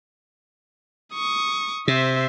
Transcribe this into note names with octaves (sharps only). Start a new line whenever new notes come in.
C#6 D#6
C3 C5 E5